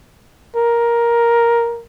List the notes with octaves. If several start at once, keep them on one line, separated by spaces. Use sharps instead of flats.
A#4